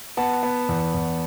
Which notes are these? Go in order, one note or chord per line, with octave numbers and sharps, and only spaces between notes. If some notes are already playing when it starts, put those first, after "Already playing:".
B3 F#5 A5
B3
E2
E2